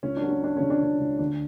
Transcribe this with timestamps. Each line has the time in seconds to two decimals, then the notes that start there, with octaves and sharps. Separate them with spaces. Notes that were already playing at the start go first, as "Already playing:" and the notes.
0.03 C#2 C#4
0.17 D4
0.22 F#3
0.30 C#4
0.42 F#3 D4
0.57 C#3 C#4
0.70 D4
0.81 C#3 C#4
1.00 C#2
1.19 D2 D4